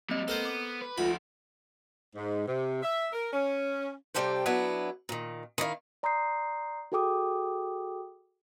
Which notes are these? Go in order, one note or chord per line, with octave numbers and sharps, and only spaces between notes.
F#3 G3 A#3 C4 D#5
B3 A4 A#4 C5
D6
B4
D2 F3 D#4 F4 B5
G#2
C3
E5
A#4
C#4
C3 D#3 G3 G4 A4 C5
F#3 B3 D4 E4
A#2 D#3
D#3 E4 D5 F5
D5 A#5 C6 D#6 G6 C7
F#4 G#4 A4 G5 D6 D#6